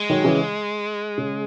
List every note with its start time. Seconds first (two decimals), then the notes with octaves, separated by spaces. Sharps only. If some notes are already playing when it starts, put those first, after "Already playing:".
Already playing: G#3
0.10 D#3 F#3
0.24 C#3 E3
1.18 C#3